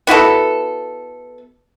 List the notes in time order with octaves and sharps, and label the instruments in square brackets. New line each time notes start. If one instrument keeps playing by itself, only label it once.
[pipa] B3 E4 F#4 A4